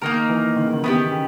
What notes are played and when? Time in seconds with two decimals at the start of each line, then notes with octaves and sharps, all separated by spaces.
0.02 D#3 A#3 D#4 A#4
0.29 E3
0.56 D#3
0.65 C#3
0.73 D#3
0.83 D#3 B3 D#4 G4
1.11 C#3